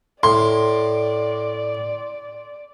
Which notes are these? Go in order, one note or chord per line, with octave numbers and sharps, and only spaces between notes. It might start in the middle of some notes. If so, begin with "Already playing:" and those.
A2 D5 C6